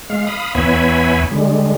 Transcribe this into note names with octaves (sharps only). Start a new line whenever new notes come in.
G#3 F5
F5 B5 D#6
E2 B3 C#5 E5 G#5 B5
D3 G3 G#3